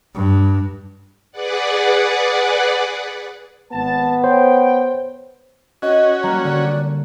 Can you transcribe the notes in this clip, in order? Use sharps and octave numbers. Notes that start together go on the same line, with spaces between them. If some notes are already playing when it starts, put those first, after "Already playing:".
G2
G#4 B4 D5 F#5
G#1 B3 A5
C5 C#5 G5
C#4 F#4 D#5
G3 A#3 A#5
D3 D5